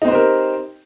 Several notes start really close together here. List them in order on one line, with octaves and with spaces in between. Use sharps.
D#4 C4 C5 G4 A#4